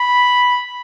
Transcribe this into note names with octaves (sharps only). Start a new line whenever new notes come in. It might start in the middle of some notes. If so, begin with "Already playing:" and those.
Already playing: B5